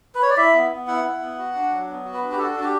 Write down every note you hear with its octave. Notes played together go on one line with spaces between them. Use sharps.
B4
C#5
D5
E4 E5
B3
B3
E4 F#5
E4
B3
F#4
D4
F#3
B3
F#4
B4
D4
G4
F#4 A4
D4 F#4
G4